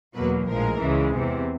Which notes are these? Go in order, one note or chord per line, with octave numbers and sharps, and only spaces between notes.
E2 B2 F#3 A#3 B4
A#1 A2 F3 G#3 A#4
C#2 C#3 E3 G#3
E2 C3 E3